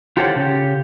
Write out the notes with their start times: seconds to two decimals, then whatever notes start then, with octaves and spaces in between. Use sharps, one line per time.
0.17 F4 G4 A4 C5 C#5 F#5
0.36 C#3 G4